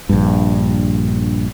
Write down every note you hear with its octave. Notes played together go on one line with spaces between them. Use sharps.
A#1 G2